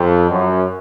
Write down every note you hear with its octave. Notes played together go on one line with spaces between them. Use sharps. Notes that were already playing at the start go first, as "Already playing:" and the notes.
Already playing: F2
F#2